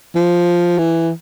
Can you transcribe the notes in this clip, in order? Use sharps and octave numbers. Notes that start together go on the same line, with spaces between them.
F3
E3